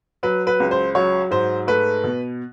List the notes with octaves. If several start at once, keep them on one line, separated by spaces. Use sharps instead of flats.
F#3 B4
B4
C#2
C5
F#3 C#5
G#2 C5
A3 B4
B2